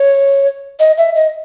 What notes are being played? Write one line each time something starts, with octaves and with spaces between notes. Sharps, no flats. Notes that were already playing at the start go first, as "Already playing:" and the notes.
Already playing: C#5
D#5
E5
D#5